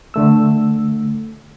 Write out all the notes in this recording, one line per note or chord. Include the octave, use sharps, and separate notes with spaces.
D3 A3 E6